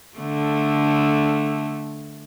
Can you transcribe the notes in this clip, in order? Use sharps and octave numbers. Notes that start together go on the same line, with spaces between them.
D3 A3